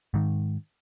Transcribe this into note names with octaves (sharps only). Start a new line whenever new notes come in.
G#2 D#3